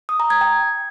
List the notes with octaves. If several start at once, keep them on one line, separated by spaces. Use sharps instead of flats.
D#6
A#5
G#6
G5